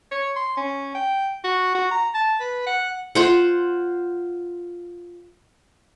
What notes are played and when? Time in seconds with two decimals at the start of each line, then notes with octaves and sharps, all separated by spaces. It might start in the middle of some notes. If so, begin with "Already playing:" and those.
0.11 C#5
0.36 C6
0.57 C#4
0.95 G5
1.44 F#4
1.75 F#4
1.91 A#5
2.15 A5
2.41 B4
2.66 F#5
3.15 F4 C5 F#5